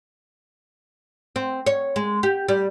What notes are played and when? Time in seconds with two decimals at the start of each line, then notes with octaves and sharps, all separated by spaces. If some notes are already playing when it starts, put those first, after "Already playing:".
1.36 C4
1.66 C#5
1.96 G#3
2.23 G4
2.48 G3